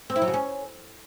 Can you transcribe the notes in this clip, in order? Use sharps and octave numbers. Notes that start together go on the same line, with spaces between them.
C4
E4
F#3
C#3
C#4